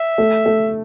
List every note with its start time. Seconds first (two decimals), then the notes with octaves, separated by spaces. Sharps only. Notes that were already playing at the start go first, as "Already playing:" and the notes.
Already playing: E5
0.18 A3
0.46 A3